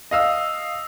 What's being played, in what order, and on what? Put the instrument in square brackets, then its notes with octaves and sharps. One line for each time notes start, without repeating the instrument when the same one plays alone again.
[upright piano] D#5 F5 E6